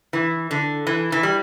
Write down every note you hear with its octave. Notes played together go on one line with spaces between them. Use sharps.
E3
D3
E3
E3
G3